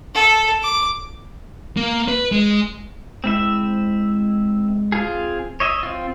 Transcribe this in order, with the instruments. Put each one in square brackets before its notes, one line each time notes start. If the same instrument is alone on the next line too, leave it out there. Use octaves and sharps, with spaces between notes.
[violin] A4
D6
[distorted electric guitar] A#3
B4
G#3
[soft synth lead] G#3 [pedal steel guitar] C4 E4 E5
[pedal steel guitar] C4 F4 G#4
C#5 D#5 E5
C4 F4